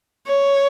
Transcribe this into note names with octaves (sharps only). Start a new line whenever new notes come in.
C#5